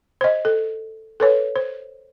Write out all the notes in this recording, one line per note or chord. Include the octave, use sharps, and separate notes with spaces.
C5 D#5
A4
A4 B4 C#5
C5